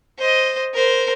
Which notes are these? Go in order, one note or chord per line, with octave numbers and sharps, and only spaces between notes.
C5 D#5
A#4 C5